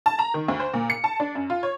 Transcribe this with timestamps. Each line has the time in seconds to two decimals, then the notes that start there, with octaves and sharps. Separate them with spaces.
0.06 A5
0.19 A#5
0.34 D#3
0.48 D2
0.60 C5
0.74 A#2
0.90 C#7
1.04 A5
1.20 D4
1.35 F#2
1.50 F4
1.63 C#5